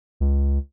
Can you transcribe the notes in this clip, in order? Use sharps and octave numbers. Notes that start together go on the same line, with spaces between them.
C#2